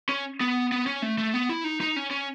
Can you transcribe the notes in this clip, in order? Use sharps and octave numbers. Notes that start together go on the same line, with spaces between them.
C#4
B3
B3
C#4
A3
A3
B3
E4
D#4
D#4
C#4
C#4